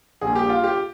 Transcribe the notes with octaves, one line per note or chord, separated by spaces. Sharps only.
A#1 A#2 G3 G#4
G4
F4
G4